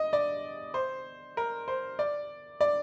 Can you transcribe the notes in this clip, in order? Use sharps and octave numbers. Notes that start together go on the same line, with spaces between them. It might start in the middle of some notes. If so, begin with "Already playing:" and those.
Already playing: D#5
D5
C5
A#4
C5
D5
D5